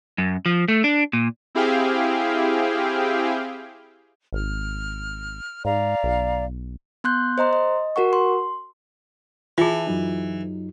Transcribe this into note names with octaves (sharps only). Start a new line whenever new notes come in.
F#2
F3
A3
D4
A#2
C4 E4 G4 G#4 F5 G5
G#1 F6
G#2 D5 F5 A#5
B1
B3 C6 F#6 G6
C5 D#5 A#5 C6
D#5
F#4 A#4 F#5 C#6
C6
E3 F4 G#4 E5 A5
F#2 F#3 D#4